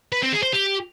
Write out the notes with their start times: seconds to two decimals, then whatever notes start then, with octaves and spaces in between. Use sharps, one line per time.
0.12 B4
0.23 C4
0.33 G#4
0.43 C5
0.53 G4